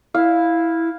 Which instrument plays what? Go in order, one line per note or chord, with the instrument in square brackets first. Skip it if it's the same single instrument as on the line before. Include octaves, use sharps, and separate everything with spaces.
[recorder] E4 [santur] F5